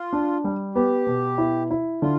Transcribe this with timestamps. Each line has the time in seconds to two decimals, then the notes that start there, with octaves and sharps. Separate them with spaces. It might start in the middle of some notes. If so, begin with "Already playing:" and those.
Already playing: F4
0.13 D4
0.44 G3
0.75 B3 G4
1.07 B2
1.38 E4
1.71 E4
2.01 D3 F4